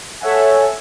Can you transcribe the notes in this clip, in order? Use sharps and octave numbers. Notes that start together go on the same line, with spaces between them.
A4 C#5 E5 F#5 G#5